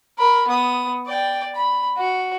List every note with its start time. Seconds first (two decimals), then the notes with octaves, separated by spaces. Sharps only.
0.18 A#4 B5
0.47 B3 D#6
1.07 D5 G5
1.56 B5
1.97 F#4